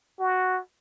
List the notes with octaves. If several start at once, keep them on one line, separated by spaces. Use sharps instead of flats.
F#4